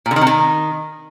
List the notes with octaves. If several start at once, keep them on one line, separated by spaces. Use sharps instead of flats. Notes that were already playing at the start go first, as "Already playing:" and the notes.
A#2
D3
D#3
C3
D#3